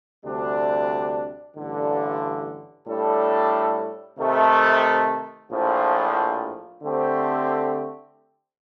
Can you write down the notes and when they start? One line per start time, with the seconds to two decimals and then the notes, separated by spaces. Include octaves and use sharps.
0.24 D2 C3 G3 D4
1.56 A1 G2 D3
2.87 A2 G3 D4 A4
4.18 C3 D#3 A3
5.50 A#1 A2 F3
6.82 D3 A3 C4 G4